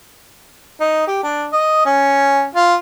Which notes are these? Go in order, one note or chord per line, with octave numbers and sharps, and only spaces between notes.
D#4
G4
D4
D#5
C#4
F4